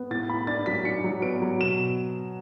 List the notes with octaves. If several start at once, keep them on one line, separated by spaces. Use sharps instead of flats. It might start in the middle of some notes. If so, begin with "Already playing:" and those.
Already playing: B3
A2 A6
A2 B5
D4 A6
F#3 B6
D4 C#7
F#3
B3 D7
F#3
B2 E7